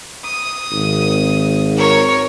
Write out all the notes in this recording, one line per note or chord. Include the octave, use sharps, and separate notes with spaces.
D#6
G#1
A#4 C#5